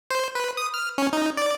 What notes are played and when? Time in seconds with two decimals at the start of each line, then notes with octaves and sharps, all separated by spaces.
0.11 C5
0.35 B4
0.57 D#6
0.74 F6
0.98 C#4
1.13 D#4
1.37 D5